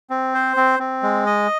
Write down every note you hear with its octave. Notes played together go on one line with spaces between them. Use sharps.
C4
C5
C4
C4
G#3
D#5